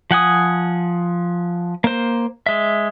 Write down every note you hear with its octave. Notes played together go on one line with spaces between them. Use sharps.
F3 F#5 G#5 D#6
A#3 C5
G#3 E5